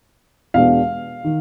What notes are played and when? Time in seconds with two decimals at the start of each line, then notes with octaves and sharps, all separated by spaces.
0.54 E2 B2 G#3 B3 D4 F5
1.24 D#3